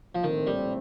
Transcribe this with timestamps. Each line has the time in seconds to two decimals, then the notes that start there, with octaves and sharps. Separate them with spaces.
0.15 F3
0.24 A#1 A2 D#3 A3 C4
0.47 G3